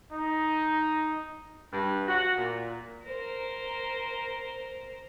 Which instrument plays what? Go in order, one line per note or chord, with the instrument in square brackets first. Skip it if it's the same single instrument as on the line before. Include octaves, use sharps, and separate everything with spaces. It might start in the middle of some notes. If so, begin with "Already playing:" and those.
[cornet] D#4
[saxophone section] G2
F#4
A#2
[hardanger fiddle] A#4 C5